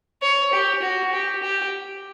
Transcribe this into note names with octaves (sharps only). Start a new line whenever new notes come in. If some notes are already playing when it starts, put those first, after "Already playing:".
C#5
G4
F#4
G4
G4